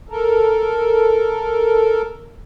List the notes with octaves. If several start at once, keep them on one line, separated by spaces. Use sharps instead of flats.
A4 A#4